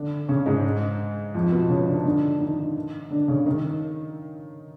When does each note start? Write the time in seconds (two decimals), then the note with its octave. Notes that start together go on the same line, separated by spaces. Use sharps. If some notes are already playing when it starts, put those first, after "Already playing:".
Already playing: D3 D4
0.28 C#3 C#4
0.46 G#2 G#3
1.35 F2 F3
1.52 B2 B3
1.70 C#3 C#4
1.87 D4
1.96 D#4
2.06 D3 D4
2.36 D4
2.40 D#3 D#4
3.10 D3 D4
3.28 C#3 C#4
3.46 D#3 D#4